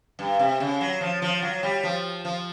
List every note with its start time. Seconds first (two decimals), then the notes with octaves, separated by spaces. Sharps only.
0.19 G2
0.39 C3
0.60 C#3
0.81 F#3
1.01 F3
1.22 F3
1.42 F#3
1.63 G3
1.83 F3
2.25 F3